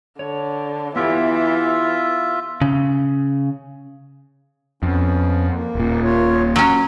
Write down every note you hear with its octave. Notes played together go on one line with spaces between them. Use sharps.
D3 C#5
E3 B3 E4 F4 G4 E5
C#3
F2 B3 C#4
A#3
D#1 A#2
F4 C#5
A#2 F#3 C#4